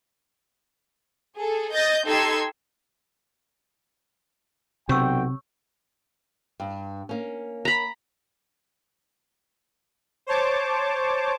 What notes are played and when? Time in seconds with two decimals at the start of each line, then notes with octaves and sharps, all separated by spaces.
1.36 G#4 A4
1.73 D#5 G6 A6 A#6
2.06 D#4 G4 A4 C6 E6 G#6
4.89 B1 C3 F#4 C#5 G5 C#6 E6
6.60 G2
7.09 A#3 C#4
7.65 A#5 B5
10.27 C5 C#5 A5 D6